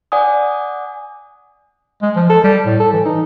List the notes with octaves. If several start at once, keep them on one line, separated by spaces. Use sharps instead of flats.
D5 F#5 G#5 D#6
G#3
F3
A4
G3
A2
A4
E3
D#4